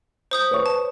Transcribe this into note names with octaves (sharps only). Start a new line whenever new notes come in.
C5 D#6 G6
B4 C#5 C#6
A5